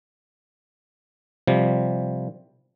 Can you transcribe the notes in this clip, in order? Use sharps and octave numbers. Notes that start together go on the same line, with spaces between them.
C3 F3 G3